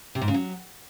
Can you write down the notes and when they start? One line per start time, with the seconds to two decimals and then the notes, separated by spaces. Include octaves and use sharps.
0.15 C3
0.21 G#2
0.28 C#3
0.34 F#3